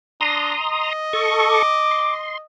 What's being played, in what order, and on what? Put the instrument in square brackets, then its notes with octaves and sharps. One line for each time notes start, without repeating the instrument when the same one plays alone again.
[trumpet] D4 [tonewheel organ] A#5 C6 D#6
[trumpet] D#5
[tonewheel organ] A4 C#6
[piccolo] D6
[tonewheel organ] C6